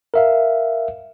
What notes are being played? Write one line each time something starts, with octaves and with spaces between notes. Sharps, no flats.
A#4 E5 F5